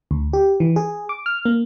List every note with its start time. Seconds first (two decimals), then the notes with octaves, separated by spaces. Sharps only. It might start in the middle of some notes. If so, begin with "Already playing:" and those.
0.11 D2
0.33 G4
0.60 E3
0.76 G#4
1.09 D6
1.26 F6
1.45 A#3